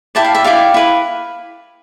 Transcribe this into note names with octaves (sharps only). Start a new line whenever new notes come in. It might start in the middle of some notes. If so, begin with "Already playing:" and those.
E4 G4 D5 A5
F5
E5
E4 G4 D5 F5
E4 B4